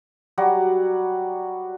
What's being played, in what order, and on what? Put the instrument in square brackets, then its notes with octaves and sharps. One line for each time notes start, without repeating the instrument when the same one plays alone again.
[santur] F#3 G3 F#4